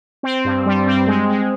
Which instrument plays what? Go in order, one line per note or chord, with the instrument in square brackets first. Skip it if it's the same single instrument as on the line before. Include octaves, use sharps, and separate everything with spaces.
[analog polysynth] C4
G2
G3
C4
G#3
G#3